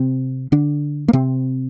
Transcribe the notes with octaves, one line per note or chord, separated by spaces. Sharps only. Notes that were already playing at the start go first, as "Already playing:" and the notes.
Already playing: C3 C4
D3 D4
A#3
C3 C4